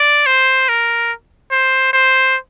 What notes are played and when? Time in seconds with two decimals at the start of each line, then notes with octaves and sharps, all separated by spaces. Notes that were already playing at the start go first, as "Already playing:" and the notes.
Already playing: D5
0.26 C5
0.69 A#4
1.52 C5
1.93 C5